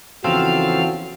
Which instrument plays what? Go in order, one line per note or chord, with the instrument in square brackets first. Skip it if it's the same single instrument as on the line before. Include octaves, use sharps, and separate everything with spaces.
[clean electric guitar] E2 C4 [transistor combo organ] C#3 F3 A4 [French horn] F#4 [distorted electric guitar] F5